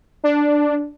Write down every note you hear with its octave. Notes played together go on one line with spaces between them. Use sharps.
D4